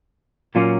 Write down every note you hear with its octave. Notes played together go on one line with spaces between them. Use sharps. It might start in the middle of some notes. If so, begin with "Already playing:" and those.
A#2 F#3 A#3 C#4 F4